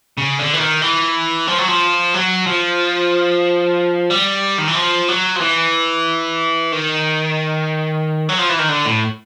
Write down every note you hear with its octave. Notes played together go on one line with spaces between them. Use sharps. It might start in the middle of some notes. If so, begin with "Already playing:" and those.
C#3
D3
E3
D#3
E3
F3
F#3
F3
F#3
F3
G3
D#3
E3
F3
F#3
F3
E3
D#3
F#3
F3
E3
D#3
D3
A2